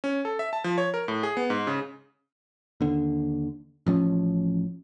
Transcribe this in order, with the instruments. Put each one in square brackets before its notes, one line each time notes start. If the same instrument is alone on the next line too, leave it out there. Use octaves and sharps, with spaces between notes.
[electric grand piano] C#4
A4
E5
A5
F3
C#5
A#4
A2
G#4
B3
G#2
C#3
[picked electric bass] D#2 D3
A1 F3 C#4